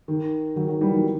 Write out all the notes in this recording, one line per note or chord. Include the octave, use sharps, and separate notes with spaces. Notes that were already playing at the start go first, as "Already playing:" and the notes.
D#3
D#3 F#3
D#3 F#3
E3 G3
D#3 F#3